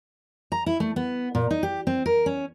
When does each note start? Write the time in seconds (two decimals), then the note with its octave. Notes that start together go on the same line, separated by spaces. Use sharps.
0.52 A#5
0.66 E4
0.80 A3
0.96 B3
1.35 A#2
1.51 D#4
1.63 G4
1.87 C4
2.06 A#4
2.26 C#4